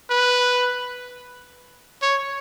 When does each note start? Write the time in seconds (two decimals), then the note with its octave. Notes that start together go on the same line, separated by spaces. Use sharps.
0.10 B4
2.02 C#5